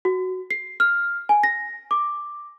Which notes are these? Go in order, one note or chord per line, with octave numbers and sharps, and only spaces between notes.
F#4
C7
F6
G#5
A#6
D6